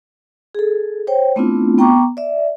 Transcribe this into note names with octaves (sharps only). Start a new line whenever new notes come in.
G#4 A4
C5 C#5 G5
A3 B3 C4 D4 E4 F4
B3 G5 A#5 C#6 D6
D5 E5